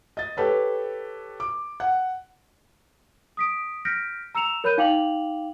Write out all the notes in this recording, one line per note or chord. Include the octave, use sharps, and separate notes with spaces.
D#5 A6
G4 A4 B4 C#5
D6
F#5
D#6 B6 D7
F6 G6 A#6 B6 C#7 D7
A#5 E6 C#7 E7 F7
A#4 C#5 B5 F#6 G6 D#7
D#4 F5 G5 D6 F7 F#7